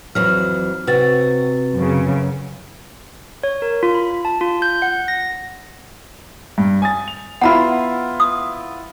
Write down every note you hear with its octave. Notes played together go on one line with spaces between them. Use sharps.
F2 E3 F#3 F6
C3 F#4 B4 A6
F#2 C#3
C#5
A#4
F4
B5
A5
F4
G6
F#5
A#6
G2
G#5 D#6 A6
F7
B3 E4 F4 F#5 A#5 B5
D#6